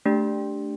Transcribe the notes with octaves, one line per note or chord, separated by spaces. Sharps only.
A3 D4 G4